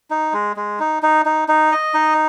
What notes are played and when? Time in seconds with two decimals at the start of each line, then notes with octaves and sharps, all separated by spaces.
0.11 D#4
0.33 G#3
0.56 G#3
0.80 D#4
1.03 D#4
1.26 D#4
1.48 D#4
1.72 D#5
1.94 D#4